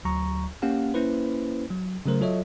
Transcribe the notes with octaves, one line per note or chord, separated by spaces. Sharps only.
D2 F#3 A#5 C#6
A#3 C#4 G4 F5 F#5
A#3 C#4 E4 B4 C5
F#3
C#3 F#3 A3 A#4 C5
F#3 F4 A4 C#5 D#5 E5